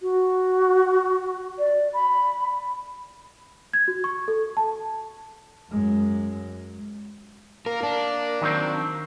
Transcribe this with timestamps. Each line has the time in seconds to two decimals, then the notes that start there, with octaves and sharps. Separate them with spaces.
0.01 F#4
1.59 D5
1.93 B5
3.73 G#6
3.88 F#4
4.04 C#6
4.28 A4
4.57 A5
5.71 F#2 G#3
7.66 A#3 A#4
7.83 D4
8.41 D#3 F#3 C4